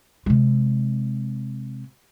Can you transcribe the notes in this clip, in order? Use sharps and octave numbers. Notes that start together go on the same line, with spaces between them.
C3 G#3